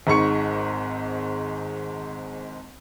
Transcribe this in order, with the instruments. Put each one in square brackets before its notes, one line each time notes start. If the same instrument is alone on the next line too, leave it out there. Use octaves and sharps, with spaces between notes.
[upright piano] G#1 G#2 C#6 C#7